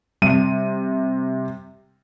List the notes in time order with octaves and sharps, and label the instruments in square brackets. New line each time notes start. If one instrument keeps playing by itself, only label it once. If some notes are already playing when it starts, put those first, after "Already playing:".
[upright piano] C3 D#7 [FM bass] G3